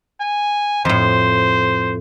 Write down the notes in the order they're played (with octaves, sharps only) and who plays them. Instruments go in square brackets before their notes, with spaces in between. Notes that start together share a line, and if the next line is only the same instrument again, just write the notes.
[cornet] G#5
[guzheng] F2 A2 [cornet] C5